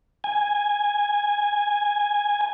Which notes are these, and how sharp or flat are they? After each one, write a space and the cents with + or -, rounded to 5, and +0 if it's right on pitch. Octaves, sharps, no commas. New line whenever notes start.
G#5 -10